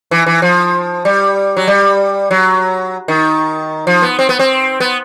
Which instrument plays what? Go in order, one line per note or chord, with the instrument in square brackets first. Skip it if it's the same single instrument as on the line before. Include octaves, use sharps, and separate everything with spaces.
[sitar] E3
E3
F3
G3
F#3
G3
F#3
D#3
F3
B3
C4
B3
C4
B3